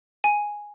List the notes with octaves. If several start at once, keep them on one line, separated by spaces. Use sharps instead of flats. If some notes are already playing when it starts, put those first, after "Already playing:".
G#5